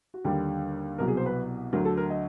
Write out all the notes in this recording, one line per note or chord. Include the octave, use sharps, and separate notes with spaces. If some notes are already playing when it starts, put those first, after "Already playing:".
F#4
D#2 D3 G3 G4
C2 B2 F#3 A#4
G#4
C5
B4
D2 D3 F#3 A#4
A4
A#4
D#5